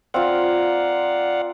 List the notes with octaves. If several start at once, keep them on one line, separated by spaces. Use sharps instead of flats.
C4 F4 A#4 D5 F5 F#5